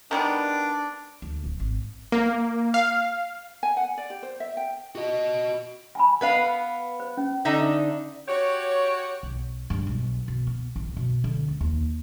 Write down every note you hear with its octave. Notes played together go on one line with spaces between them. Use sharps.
D#3 G3 B3 D4
D2
D1
G#1
A#3
F5
G#5
F#5
D5
G4
C5
E5
G5
F#4 D#5
G#5 A5 B5
B3 B4 F5
C5
C#4
D3 D#4 E5
F#4 G4 C#5
B1
G2
B1
B2
B3
A1
B2
D3
C#2
D#2